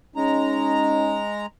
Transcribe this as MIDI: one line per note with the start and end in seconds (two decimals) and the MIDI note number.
0.16 1.46 56
0.16 1.22 61
0.16 1.22 63
0.16 1.46 82